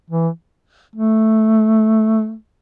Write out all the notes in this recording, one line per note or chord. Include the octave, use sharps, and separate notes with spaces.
E3
A3